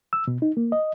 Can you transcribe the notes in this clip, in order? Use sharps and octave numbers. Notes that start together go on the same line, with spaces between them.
E6
B2
D#4
A#3
D#5